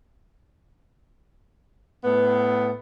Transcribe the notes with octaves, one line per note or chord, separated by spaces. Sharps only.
A2 B3